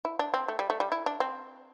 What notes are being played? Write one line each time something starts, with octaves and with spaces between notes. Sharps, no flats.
E4
D4
C4
A3
G3
A3
G3
E4
D4
C4